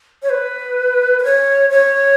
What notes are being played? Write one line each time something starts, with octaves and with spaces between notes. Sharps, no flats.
C#5
B4
B4
C#5
C#5